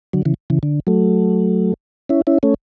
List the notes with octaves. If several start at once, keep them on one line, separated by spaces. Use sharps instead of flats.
D3 F#3
C#3 E3
C#3 E3
D3
F#3 A3
C#4 E4
C#4 E4
A3 C#4